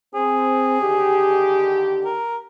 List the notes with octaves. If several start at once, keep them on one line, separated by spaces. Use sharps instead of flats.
C4 G#4
D3 D#3 G4
A#4